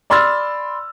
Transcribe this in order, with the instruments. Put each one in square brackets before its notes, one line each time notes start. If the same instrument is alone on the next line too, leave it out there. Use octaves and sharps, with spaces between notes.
[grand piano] D5 B5 C6 E6 F6 A6